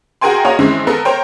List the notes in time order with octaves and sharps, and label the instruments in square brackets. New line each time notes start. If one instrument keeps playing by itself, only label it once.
[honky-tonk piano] F#4 G#4 A#4 G5 G#5 C6
A#3 F#4 C#5 D#5 G#5 A#5
D#3 E3 G#3 C4 C#4 E4
B3 A4 A#4
A#4 C5 C#5 G5